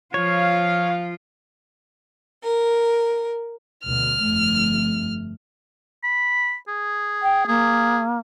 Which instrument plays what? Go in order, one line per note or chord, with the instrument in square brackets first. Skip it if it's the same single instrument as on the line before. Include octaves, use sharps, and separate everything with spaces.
[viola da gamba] F3 F4 [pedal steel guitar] C#5 [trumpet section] F5
[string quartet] A#4
[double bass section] D2 B2 [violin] F6
[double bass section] G1 F2 A3
[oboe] B5
G#4
[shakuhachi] G5
[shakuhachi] A#3 [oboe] G#4